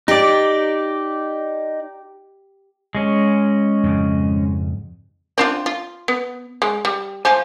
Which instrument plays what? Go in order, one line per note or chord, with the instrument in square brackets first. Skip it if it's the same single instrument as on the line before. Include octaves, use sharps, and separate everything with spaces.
[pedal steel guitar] D#4 D5 [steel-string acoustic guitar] G4
[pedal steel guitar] G#3 C#4
[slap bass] F2 G#2 C#3
[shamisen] C4 D4 F4
F4
B3
G#3
G3
F3 C5 G#5